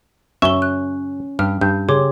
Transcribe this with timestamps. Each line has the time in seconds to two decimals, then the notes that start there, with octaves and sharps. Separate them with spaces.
0.42 F#2 C#4 E5 C#6 G7
0.62 F#6
1.39 G2 G4 F6
1.61 G2 G6
1.89 C#3 G4 G#4 C#5 C6 D6